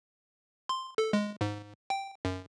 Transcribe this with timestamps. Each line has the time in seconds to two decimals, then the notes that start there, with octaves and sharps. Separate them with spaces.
0.69 C6
0.98 A4
1.13 G#3
1.41 G#2
1.90 G5
2.25 F#2